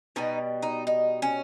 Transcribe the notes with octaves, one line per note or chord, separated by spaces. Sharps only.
B2 G3 D#4
D#4
D#4
C#4